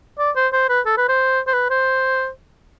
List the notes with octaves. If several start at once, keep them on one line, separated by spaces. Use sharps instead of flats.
D5
C5
C5
B4
A4
B4
C5
C5
B4
C5